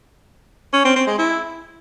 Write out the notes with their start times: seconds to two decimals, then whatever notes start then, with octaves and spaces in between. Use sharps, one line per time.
0.73 C#4
0.84 C4
0.96 C4
1.07 G#3
1.18 E4